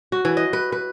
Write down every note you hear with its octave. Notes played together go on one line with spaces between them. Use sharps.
F#4
E3
D#5
B4
B4